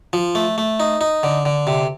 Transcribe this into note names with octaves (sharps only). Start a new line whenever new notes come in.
F3
A3
A3
D#4
D#4
D3
D3
C3